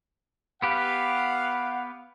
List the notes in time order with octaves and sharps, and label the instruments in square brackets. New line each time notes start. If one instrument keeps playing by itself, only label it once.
[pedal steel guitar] B3 G4 B4 [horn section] F5 F#5